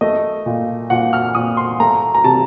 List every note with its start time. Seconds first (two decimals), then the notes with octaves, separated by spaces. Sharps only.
0.01 A3 D#5
0.46 A#2
0.90 A#2 F#5
1.13 F6
1.35 A#2 D#6
1.57 C6
1.80 A3 A#5
2.14 A#5
2.24 C3 A5